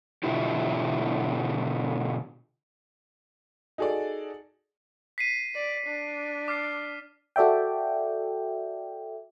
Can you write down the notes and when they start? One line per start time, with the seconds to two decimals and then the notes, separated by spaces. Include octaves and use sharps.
0.24 B2 D3 E3 E4 F4 G4
3.78 D#4 F#4 G#4 A4 D5
5.18 B6 C7 D#7
5.55 D5
5.86 D4
6.48 D6 F6 C7
7.36 F#4 A4 D5 E5 G5